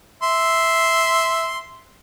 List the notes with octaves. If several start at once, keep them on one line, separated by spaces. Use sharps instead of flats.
E5 C6